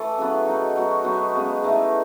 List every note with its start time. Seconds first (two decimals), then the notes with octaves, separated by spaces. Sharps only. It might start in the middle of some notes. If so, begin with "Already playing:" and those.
Already playing: E3 A3 E4 A4
0.18 C#3 F#3 B3
0.47 F#3 B3 D#4
0.76 F#3 B3 F#4
1.04 F#3 B3 D#4
1.33 C#3 G#3 B3
1.62 E3 A3 D#4 G#4